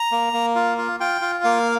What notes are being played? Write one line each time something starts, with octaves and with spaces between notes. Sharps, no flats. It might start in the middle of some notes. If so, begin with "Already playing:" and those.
Already playing: A#5
A#3
A#3
F4
F4
F4 G5
F4
A#3 F5